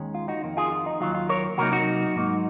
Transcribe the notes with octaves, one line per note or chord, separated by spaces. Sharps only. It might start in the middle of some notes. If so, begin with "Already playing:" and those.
Already playing: D#2 D#3 G#3 C#4
F4
D#4 F#4
F2 D#3 A#3
F4 G#4
F4
D#4
D#2 D#3 F#3 F4
F4
A#4 C#5
C3 F#3 A#3 D#4 F#4 A#4
D#4 F#4
G#2 F#3 A#3 D#4